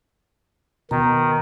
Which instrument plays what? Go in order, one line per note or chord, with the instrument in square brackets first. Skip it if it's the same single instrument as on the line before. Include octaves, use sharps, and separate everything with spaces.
[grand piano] B2 [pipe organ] D#3 [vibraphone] A#5